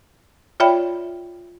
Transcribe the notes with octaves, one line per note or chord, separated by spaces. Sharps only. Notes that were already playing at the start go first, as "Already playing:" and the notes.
F4 C#5 D5 E5 G5 B5